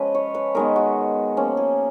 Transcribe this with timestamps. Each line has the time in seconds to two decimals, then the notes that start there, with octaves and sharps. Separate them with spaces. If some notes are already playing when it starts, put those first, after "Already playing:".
Already playing: F3 G#3 C#4 B4 D#5
0.15 C#5
0.35 B4
0.55 D#3 G#3 B3 A#4
0.76 F#4
1.37 F3 A#3 C#4
1.57 G#4